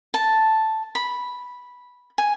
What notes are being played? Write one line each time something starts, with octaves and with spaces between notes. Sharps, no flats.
A5
B5
G#5